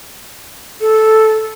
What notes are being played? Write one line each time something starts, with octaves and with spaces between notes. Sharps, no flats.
A4